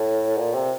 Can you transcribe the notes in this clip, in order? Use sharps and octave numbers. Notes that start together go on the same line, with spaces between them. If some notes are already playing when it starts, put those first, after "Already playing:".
Already playing: A2
A#2
C3